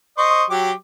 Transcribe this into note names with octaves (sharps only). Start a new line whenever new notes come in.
C5 D#5 C#6
F#3 G4 D6